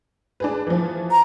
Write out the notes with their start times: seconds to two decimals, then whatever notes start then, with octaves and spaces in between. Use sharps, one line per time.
0.40 D4 G#4 B4
0.67 E3 F3
1.11 A#5